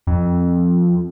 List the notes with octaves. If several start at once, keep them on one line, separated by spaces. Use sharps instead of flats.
F2